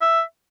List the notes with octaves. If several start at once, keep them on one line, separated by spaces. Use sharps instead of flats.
E5